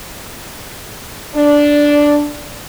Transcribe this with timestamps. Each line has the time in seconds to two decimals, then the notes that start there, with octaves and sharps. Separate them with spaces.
1.34 D4